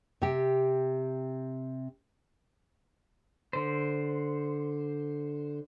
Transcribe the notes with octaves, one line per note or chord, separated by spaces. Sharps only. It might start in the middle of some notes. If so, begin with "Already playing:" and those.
C3 G4
D3 C5